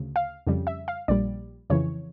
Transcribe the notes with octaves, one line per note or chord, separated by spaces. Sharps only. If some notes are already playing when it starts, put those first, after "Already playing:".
Already playing: D2 C#3
F5
F2 C#3 G3
E5
F5
A#1 A#2 G3 D5
F2 C#3 E3 C#5